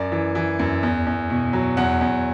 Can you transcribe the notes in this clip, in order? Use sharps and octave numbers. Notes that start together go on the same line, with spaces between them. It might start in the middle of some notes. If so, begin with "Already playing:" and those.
Already playing: F#2 D5
E3
E3
F#2
E2
E2
B2
F#3
E2 F#5
E2